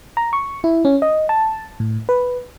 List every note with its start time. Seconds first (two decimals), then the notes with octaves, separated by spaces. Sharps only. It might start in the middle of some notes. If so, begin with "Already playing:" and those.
0.17 A#5
0.33 C#6
0.64 E4
0.85 C#4
1.02 D#5
1.29 A5
1.80 A2
2.09 B4